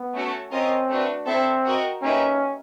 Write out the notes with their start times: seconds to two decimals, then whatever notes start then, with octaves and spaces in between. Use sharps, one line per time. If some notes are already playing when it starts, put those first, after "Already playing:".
Already playing: B3
0.15 A3 C#4 F#4 A4
0.52 C4 C#4 F4 A#4 D#5
0.89 A3 D4 F#4 B4
1.27 C4 E4 A4 C5 E5
1.65 F#4 A#4 D#5 G5
2.02 A#3 C#4 D#4 G4 B4 E5